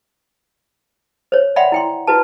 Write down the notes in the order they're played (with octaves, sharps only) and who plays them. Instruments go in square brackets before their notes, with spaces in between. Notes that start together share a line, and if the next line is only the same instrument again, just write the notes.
[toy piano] C5 C#5
D5 E5 F#5 G5 B5 C6
E4 G5 C6
E4 F#4 B4 A5